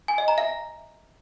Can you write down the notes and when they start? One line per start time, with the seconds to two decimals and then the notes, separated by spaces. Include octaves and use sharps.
0.08 G#5
0.18 D#5
0.28 A#5
0.38 E5